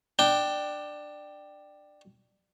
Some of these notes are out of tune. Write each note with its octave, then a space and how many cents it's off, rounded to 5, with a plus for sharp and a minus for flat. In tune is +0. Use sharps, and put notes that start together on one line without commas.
D4 +15 G5 -5